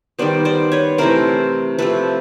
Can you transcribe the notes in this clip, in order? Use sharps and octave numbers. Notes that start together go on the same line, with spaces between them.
D#3 G3 B3 C5 D5
C5 D5
B4 C#5
C3 E3 A3 A#4 C5
C3 F3 A3 A4 B4